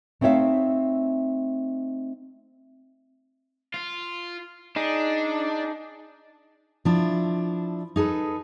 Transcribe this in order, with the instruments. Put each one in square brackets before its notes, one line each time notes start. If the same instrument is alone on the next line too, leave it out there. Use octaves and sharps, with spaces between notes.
[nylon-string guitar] A3 C4 D#4 C#5 E5 F5
[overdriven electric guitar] F4
[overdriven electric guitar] D4 [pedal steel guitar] D#4 G#4
[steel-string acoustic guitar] F3 D4 E4
D#4 G#4 A4 B4